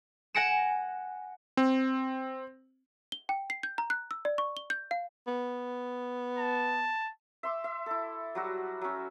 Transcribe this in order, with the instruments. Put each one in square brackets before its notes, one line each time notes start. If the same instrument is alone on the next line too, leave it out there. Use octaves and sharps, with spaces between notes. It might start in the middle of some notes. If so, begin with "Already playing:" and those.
[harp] F#5 G#5 A#6 C#7 D7 E7
[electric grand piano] C4
[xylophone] G7
G5
C7
G6
A#5
F#6
E6
D5
C#6
G7
G6
F5
[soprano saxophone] B3
[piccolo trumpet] A5
[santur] E5 C6 D6
E5
E4 A4
F#3 G3 F#4
F#3 C#4